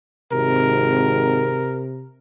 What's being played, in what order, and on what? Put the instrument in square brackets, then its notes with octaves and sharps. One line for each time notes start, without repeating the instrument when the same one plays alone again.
[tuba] G#1 [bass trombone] C3 [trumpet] A#4